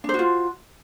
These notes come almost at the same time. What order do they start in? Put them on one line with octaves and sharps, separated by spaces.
D4 C5 F#4 F4